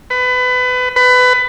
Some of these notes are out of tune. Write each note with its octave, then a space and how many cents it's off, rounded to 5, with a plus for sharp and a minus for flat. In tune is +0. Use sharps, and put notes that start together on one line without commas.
B4 +25
B4 +20